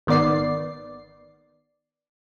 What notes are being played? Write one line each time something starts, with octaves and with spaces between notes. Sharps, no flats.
G#1 D#3 B3 D5 C7